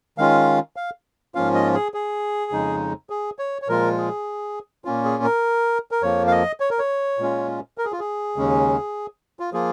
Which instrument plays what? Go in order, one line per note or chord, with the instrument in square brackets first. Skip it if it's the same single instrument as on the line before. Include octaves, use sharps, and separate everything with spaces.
[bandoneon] D#3 G#3 C#4 F4 F5
F5
G#2 F3 A#3 C#4 F4 F5
D#5
G#4
G#4
F2 C#3 G#3 D#4
G#4
C#5
C#5
A#2 F3 G#3 F4 A#4
G#4
A#2 A#3 C#4 F4
G#4
A#4
A#4
F2 F3 A#3 C#5
F5
D#5
C#5
A#4
C#5
A#2 G#3 C#4 F4
A#4
G#4
F4
G#4
D#2 C#3 G#3 C#4
F4
F3 A#3 F4 G#4